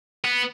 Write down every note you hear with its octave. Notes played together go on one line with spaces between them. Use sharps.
B3